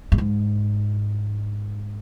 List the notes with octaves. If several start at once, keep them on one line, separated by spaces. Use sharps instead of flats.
G2
G#2